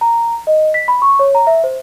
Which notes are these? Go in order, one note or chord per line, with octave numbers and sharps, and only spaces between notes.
A#5
D#5
B6
B5
C#6
C#5
A#5
E5
C5